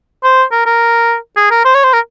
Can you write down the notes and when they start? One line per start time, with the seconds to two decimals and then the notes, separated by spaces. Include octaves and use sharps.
0.24 C5
0.52 A#4
0.66 A#4
1.37 G#4
1.51 A#4
1.65 C5
1.75 C#5
1.84 C5
1.93 A#4